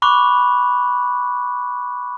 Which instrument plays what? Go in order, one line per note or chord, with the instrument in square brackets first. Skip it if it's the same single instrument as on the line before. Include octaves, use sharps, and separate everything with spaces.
[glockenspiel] B5 C#6 D6 F#6